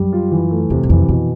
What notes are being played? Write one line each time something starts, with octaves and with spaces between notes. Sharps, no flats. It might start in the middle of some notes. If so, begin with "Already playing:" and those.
Already playing: F#2 G3
F4
E3
A3
E2 C3
F#2
F2 E3
F2 B2